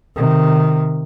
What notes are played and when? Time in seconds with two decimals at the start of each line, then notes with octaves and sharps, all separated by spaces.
0.15 C3 D#3